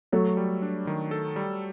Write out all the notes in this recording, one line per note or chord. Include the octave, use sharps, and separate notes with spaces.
F#3 A3 A4
G3
D4
D#3
A4
G3